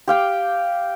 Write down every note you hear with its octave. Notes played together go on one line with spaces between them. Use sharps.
G4 F5 G5